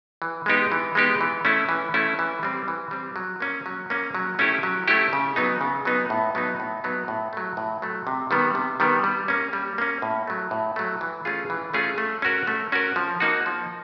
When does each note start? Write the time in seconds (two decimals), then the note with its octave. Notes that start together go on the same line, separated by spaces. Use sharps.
0.22 E3
0.46 G#3 B3 D#4 G4
0.72 E3
0.95 G#3 B3 D#4 G4
1.21 E3
1.45 A3 C#4 E4
1.69 E3
1.94 A3 C#4 E4
2.19 E3
2.43 G3 C4
2.68 E3
2.91 G3 C4
3.16 F#3
3.40 A#3 C#4
3.66 F#3
3.90 A#3 C#4
4.15 F#3
4.39 A3 C#4 E4 G4
4.63 F#3
4.88 A3 C#4 E4 G4
5.13 C#3
5.36 F#3 B3 D#4
5.61 C#3
5.85 F#3 B3 D#4
6.10 A2
6.35 F#3 B3 D#4
6.60 A2
6.84 F#3 B3 D#4
7.08 A2
7.33 F#3 A3
7.57 A2
7.82 F#3 A3
8.07 C3
8.31 D#3 G3 B3
8.55 C3
8.80 D#3 G3 B3
9.04 G3
9.28 A#3 C#4
9.53 G3
9.78 A#3 C#4
10.02 A2
10.27 F#3 A3
10.51 A2
10.76 F#3 A3
11.01 E3
11.25 A3 C#4 F4 G#4
11.50 E3
11.74 A3 C#4 F4 G#4
11.98 A3
12.22 C#4 F#4 A#4
12.47 A3
12.72 C#4 F#4 A#4
12.96 F3
13.20 A#3 D#4 F#4
13.46 F3